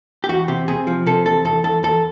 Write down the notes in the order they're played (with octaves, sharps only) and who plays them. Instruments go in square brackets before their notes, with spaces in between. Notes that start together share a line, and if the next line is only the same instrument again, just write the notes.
[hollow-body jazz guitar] G4
E2 F#4
C3 G4
C3 G#4
F3
C3 A4
E2 A4
E2 A4
E2 A4
E2 A4